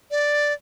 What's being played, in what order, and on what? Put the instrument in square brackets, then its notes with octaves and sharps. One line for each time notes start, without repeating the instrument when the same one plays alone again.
[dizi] D5